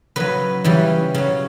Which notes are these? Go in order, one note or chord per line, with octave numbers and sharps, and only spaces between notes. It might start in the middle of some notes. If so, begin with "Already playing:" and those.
C#3 F#3 B4
C#3 E3 G3
C#3 F#3